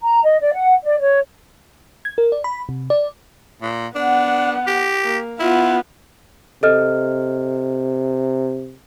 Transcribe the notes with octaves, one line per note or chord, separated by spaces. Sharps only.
A#5
D#5
D5
F#5
D5
C#5
G#6
A#4
D5
B5
C3
D5
A#2
B3 D4 F#5
G4
A#3
B3 E4 F4
C3 A4 D#5 F6